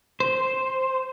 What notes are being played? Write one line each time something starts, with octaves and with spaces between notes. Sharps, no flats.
C5